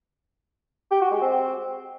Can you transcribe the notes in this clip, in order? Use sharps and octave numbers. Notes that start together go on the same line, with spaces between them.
G4
F#4
G#3
C4